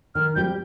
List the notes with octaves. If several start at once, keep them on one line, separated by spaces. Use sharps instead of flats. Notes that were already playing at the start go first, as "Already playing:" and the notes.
D#3 F6
G3 C4 G4 G6